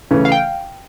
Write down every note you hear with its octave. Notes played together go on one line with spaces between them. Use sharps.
C#3 E3 A3 C#4
F5
G5